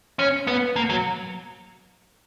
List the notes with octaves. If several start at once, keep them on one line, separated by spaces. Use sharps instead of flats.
C#4
B3
A#3
F#3